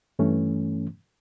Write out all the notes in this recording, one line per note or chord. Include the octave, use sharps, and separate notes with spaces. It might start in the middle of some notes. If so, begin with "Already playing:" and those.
G2 E3 A3 C#4